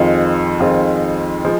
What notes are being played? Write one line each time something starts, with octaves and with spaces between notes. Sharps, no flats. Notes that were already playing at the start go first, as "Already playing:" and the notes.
Already playing: F2 D#3 G#3 C4 F4
F2 D#3 G#3 C4 F4
F3 G#3